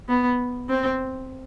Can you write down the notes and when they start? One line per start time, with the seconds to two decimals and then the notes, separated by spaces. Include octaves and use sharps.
0.08 B3
0.69 C4